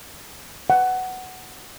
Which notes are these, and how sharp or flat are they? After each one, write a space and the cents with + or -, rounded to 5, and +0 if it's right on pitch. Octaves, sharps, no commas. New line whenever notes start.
F#5 +10